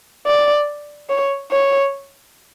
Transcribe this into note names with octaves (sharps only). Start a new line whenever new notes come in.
D5
C#5
C#5